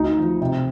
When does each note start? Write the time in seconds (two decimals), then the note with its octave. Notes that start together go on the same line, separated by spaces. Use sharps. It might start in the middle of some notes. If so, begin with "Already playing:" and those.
Already playing: D2 D#4
0.17 F3
0.41 C3